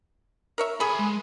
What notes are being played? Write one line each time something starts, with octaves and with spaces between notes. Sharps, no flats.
A#4 C#5 E5
G#4 A4 G#5 B5
G#3